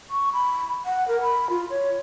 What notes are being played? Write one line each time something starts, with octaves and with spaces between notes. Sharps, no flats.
C#6
B5
F#5
A#4
B5
F4
C#5